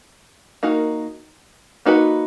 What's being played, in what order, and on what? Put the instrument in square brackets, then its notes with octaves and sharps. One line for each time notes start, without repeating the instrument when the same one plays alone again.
[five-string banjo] A#3 D#4 F#4 A#4
A#3 D#4 F#4 B4